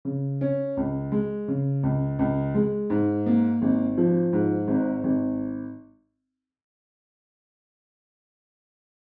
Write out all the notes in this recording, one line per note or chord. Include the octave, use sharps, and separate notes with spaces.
C#3
C#4
C#2
G#3
C#3
C#2
C#2
G#3
G#2
A#3
G#1
F3
G#2
G#1
G#1